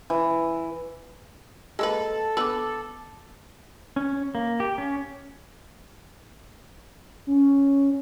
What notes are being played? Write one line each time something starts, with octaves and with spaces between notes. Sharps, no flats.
E3
G#3 A#3 A4 B4
B3 D4 B4 D6 E6
C#4
A#3
G4
C#4
C#4